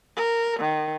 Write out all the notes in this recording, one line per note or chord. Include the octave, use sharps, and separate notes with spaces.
A#4
D#3